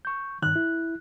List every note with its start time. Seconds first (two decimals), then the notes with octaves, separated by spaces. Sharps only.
0.05 C#6 G6
0.42 G2 D#3 F#6
0.56 E4